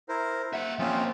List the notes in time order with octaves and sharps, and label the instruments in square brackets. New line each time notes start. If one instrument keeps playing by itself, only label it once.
[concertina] E4 A#4 C5
[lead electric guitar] A#3 E5 [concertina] F#5
[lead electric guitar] F3 A#3 [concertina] C4 C#4 F4